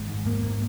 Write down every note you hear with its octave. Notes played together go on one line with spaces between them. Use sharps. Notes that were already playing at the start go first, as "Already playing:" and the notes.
Already playing: G#1 G#3
G#2
G#2 A#3
G#2 A#3